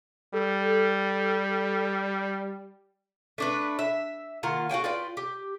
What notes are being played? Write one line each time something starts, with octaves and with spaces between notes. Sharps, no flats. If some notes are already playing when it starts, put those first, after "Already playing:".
G3 A4
A3 D4 B4
E5
D#3 A#3 F4 F#5
F#4 F5 G5 G#5
F4 B4 D5 G5
G4